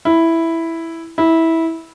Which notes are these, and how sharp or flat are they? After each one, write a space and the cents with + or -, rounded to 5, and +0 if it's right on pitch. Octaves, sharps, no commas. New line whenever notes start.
E4 +0
E4 -15